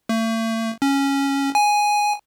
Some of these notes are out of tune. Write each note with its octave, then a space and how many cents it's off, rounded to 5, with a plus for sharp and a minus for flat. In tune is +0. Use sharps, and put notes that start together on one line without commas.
A3 +40
C#4 -5
G#5 +0